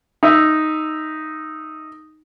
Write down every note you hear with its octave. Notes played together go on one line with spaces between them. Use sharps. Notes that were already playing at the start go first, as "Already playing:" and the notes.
D#4 E5